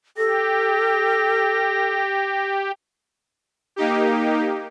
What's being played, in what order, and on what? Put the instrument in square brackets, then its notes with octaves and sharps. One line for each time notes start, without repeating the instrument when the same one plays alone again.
[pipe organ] G4 [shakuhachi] A4 [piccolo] A#6
[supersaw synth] A#3 D#4 G4